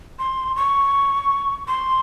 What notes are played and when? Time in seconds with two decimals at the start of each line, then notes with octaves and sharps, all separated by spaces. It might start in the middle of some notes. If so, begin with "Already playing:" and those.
0.19 C6
0.56 C#6
1.68 C6